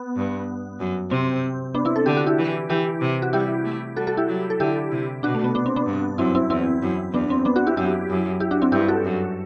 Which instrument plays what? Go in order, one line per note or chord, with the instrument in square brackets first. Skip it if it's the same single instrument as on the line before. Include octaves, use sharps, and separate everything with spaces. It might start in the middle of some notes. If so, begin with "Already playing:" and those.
Already playing: [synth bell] B3
[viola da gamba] G2
F#2
[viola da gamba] C3 [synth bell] C4
[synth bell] B3 D4
C4 E4
A4
[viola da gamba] D3 [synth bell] G4
[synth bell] F#4
E4 G4
[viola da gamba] E3
[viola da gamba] E3 [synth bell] E4 G4
[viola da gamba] C3
[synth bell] F#4
[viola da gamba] G3 [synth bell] E4 G4
[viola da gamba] A3
[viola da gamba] G3 [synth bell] F#4 A4
[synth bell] F#4 A4
E4 G4
[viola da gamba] F#3
[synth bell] A4
[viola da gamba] D3 [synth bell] E4 G4
[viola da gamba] C3
[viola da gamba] B2 [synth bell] D4 F#4
[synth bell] A3
B3
B3 D4
C4
B3 D4
[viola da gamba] G2
[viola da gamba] F#2 [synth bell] C4 E4
[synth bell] C4 E4
[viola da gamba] E2 [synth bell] C4 E4
[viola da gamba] F#2
[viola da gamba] E2 [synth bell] B3 D4
[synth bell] C4
B3 D4
D4 F#4
E4 G4
[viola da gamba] F#2 [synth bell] E4 G4
[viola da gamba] F#2
[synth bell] E4 G4
D4 F#4
C4 E4
[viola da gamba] G2 [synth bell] E4 G4
[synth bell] F#4 A4
[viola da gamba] F#2